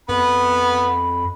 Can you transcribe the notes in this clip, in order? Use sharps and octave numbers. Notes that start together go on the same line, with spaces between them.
F2 B3 B5